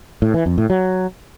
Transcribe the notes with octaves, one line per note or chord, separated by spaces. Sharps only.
A2
E3
F2
A2
F#3